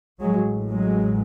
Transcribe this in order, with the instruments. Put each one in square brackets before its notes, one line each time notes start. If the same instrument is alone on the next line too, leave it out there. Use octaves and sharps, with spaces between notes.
[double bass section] A1 A2 F#3 G#3
F#3 G#3